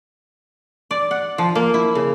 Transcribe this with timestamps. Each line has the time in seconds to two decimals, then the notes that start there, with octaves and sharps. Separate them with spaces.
0.91 D5
1.11 F#5
1.38 F3
1.55 A#3
1.74 E4
1.95 C#3